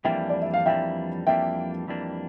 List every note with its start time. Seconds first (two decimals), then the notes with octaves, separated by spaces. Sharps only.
0.04 F2 E3 G3 A#3 D4 E5 G5
0.30 D5
0.42 E5
0.54 F5
0.66 F2 E3 G3 A#3 D4 E5 G5
1.27 F2 E3 G3 A#3 D4 E5 G5
1.87 F2 E3 G3 A#3 D4